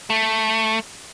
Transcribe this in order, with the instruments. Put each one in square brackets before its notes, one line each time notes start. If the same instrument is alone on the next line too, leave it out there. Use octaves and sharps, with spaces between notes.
[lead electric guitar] A3